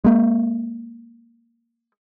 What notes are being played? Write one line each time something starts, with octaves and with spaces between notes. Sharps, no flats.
G#3 A#3